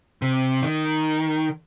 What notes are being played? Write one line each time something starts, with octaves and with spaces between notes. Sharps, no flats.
C3
D#3